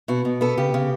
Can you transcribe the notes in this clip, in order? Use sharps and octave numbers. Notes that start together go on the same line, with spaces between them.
B2 F#4
B2
B3 A4
C#3 G4
C#3